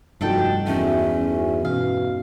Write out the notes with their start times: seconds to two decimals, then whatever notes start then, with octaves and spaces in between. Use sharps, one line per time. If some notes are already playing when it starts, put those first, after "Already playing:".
0.21 F1 G2 D4 D#4 F#4 A4 G5
0.67 E2 A3 C#4
1.65 B2 F5